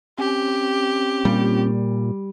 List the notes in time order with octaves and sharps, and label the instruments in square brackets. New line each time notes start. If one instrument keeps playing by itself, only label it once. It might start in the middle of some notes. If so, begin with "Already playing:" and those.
[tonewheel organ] C4 C#4 [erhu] G4
[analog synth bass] A#2 [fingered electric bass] G3